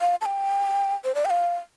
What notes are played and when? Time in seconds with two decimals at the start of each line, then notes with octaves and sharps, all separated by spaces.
0.01 F5
0.21 A5
0.26 G5
1.04 C5
1.15 D5
1.25 G5
1.30 F5